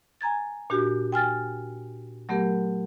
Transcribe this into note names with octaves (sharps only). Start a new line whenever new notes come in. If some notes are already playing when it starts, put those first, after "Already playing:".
G#5 A#5 G#6 A6
A#2 D4 F#4 G4
G5 G#5 F6 A6
F#3 A3 B3 G4 A#4